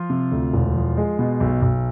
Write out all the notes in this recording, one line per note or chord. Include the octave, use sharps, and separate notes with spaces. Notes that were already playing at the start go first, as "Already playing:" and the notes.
Already playing: F3 F4
C3
D2
E1
F3
G#3
B2
B1
B1